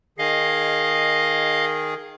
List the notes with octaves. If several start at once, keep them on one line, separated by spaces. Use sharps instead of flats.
D#3 G#4 D#5 F5